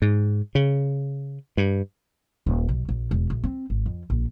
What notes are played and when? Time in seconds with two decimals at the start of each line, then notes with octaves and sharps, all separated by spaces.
0.02 G#2
0.55 C#3
1.57 G2
2.47 D#1
2.69 B1
2.89 A#1
3.11 E1
3.30 A#1
3.44 C4
3.70 G#1
3.86 F2
4.10 A#1